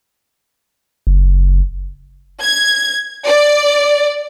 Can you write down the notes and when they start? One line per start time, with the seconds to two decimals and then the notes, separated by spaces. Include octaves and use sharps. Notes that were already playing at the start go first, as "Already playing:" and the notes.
1.07 F#1
2.42 G#6
3.25 D5